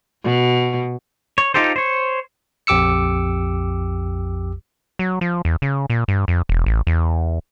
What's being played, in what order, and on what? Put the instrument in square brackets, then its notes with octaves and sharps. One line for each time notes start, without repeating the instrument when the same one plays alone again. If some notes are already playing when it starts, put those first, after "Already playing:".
[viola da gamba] B2
[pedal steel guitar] C#5
D#4 F4 G4 A4 C5
C5 C#5
[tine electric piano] A#1 F2 G4 D6 E6 C#7
[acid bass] F#3
F3
E2
C#3
A#2
G2
F2
E1
A1
E2